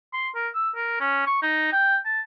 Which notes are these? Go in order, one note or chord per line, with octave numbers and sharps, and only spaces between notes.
C6
A#4
E6
A#4
C#4
C#6
D#4
G5
A5